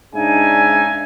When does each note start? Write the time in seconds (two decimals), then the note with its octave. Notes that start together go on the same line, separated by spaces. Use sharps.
0.14 G#2 C#3 D4 D#4 E5 G#5